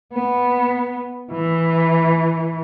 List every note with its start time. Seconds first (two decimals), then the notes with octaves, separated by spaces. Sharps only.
0.14 B3
1.32 E3